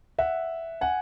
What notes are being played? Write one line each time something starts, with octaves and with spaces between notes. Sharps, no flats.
E5 F#5
F#5 G#5